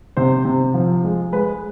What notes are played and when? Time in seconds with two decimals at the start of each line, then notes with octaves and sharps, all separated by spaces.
0.17 C3 C5
0.45 C3
0.74 F3
1.04 G#3
1.32 G#3 B4